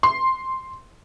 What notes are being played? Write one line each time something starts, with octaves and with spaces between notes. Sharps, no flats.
C6